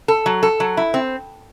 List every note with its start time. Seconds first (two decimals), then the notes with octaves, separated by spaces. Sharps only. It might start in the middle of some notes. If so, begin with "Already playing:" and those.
0.08 A4
0.26 F#3
0.43 A4
0.60 F#3
0.77 E4
0.94 C4